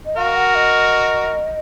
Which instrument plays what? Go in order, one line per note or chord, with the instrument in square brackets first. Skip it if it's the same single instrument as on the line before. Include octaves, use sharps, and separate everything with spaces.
[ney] D#5
[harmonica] F#4 A#4 [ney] F5
[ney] F#5
D#5